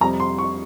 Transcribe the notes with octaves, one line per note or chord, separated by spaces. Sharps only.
F2 C3 G3 A#5
C6
C#6